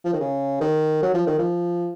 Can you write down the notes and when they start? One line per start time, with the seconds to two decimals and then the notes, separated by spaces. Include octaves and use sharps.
0.05 F3
0.13 D#3
0.20 C#3
0.61 D#3
1.03 F#3
1.14 F3
1.27 D#3
1.39 F3